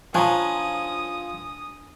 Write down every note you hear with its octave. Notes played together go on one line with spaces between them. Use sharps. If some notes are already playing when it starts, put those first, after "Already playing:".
F3 D4 C#5 G5 G#5 A#5 D#6